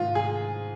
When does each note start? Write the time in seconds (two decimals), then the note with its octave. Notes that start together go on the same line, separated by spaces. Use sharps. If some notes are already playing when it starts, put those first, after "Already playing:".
Already playing: G#2 D#3 F4
0.15 G#4